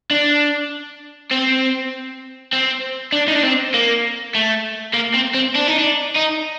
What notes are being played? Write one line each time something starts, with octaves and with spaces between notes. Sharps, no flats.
D4
C4
C4
D4
D#4
D4
C4
A#3
A3
A#3
C4
C4
D4
D#4
D4
D#4